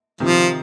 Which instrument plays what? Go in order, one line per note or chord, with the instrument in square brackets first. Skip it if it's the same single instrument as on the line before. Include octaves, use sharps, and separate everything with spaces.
[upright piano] C3 D#3 [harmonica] F3